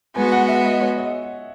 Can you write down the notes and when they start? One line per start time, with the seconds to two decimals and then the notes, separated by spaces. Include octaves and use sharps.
0.16 G#3 B3 F#4 G#5
0.32 F#5
0.48 E5
0.65 D#5
0.81 C#5
0.98 D#5